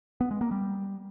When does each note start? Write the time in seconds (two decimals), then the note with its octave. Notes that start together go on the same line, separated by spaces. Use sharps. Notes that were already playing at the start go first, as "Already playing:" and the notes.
0.21 B3
0.31 G#3
0.41 A#3
0.51 G3